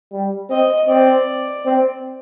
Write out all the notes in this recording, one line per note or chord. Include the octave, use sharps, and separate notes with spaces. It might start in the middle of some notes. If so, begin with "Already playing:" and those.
G3
C4 D#5
C4 D5
C4